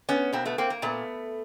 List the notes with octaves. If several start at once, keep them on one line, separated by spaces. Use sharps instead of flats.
B3 C#4
B2 A#3 C4
A3 B3
A#3 C4
A#3
A#2 A3 B3